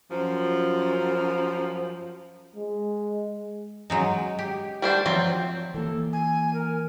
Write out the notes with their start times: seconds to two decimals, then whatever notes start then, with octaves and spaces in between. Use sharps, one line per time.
0.10 F#2 F3
2.56 G#3
3.90 F#3 G#3 D#4
4.39 G4
4.82 G3 D4 C5
5.06 F3 F#3 C4
5.74 E3 A#3 A4
6.13 G#5
6.54 A#4